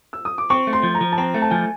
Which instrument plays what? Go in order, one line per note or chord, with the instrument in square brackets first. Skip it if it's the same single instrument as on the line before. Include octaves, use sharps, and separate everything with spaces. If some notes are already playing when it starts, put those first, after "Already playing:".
[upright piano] E6
D#6
D6
[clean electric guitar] C4 [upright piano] C#6
[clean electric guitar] A3
[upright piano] C6
[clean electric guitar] F3
[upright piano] A#5
[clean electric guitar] F3
[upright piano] A5
[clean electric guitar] C4 [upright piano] A#5
[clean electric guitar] A3
[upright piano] A5
[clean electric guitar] F3 [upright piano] G#5